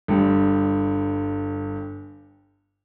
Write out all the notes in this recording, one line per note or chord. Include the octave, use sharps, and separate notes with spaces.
G1 G3